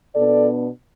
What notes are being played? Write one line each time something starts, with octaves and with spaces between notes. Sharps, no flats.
B2 B3 D4 A4 D5